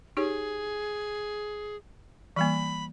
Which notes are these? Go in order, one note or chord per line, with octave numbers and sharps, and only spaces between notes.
D#4 G4 G#4 C#5
E3 G3 A#3 B5